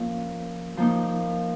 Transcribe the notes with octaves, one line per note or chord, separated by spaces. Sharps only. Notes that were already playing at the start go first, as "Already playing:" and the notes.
Already playing: F3 A#3 C#4
F3 A#3 D#4